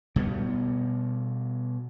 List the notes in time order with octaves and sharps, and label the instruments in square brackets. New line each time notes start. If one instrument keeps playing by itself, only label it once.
[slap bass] B2 G3 B3